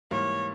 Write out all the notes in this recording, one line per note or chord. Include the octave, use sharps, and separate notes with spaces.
G#2 E3 G3 A#3 C#5